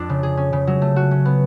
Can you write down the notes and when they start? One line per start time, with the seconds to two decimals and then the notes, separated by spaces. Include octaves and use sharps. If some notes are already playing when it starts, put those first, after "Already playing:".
Already playing: F2 D4
0.09 C#3
0.23 G#4
0.37 C#4
0.53 C#3
0.67 F#3
0.82 A3
0.96 F#4
1.11 C#4
1.25 B3